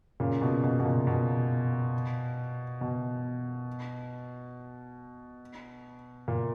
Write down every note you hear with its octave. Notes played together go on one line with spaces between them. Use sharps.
A#2 C#3
B2
B2
B2
A#2
B2
B2
A#2